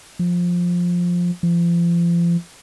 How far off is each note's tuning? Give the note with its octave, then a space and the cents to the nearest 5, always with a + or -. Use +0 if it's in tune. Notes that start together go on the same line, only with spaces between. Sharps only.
F3 +10
F3 -35